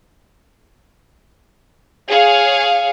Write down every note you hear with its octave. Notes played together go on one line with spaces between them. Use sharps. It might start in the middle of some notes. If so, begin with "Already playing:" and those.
G#4 C#5 F5